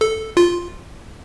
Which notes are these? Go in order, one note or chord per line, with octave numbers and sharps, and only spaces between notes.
A4
F4